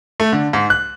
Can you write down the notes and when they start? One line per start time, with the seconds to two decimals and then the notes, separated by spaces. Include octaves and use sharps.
0.20 A3
0.32 D3
0.53 G#2
0.70 F#6